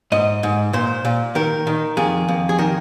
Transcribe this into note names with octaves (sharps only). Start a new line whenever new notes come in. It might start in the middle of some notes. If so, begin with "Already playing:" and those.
G#2 D#5
G#2
A#2 C5
A#2
D#3 A#4
D#3
F2 G#4
F2
G#4
D#3 A#4